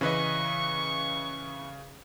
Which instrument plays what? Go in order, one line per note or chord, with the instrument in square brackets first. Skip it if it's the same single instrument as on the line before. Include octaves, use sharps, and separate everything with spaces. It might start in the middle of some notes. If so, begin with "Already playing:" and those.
[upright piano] C#3 [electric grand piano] E3 B4 D#5 [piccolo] C#6